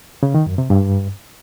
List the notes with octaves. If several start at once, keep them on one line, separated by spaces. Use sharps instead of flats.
C#3
D#3
F#2
C3
G2